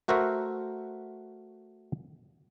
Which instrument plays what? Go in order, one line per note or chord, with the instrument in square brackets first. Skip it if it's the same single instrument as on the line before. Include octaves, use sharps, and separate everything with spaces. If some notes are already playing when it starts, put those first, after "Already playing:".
[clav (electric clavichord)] A3 F#4 A#4 C5 E5 F#5